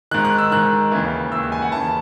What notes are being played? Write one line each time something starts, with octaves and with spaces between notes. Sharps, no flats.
G#2 D#3 F#6
F#6
E6
G#2 D#3 F#6
D#2 C#3 E3
D#2 C#3 E3 E6
G#5
F#5
D#2 C#3 E3 A5